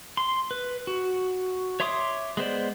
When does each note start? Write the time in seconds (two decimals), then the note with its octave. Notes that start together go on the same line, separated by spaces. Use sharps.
0.17 C6
0.51 B4
0.87 F#4
1.80 C#5 E5 C6 D6 D#6
2.37 G#3 B3 C5 D5